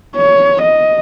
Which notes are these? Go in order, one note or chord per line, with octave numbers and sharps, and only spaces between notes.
C#5
D#5